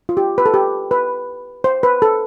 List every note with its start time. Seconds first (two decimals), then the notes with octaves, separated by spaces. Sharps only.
0.09 F4
0.17 G4
0.38 B4
0.46 A4
0.54 G4
0.91 B4
1.64 C5
1.83 B4
2.02 A4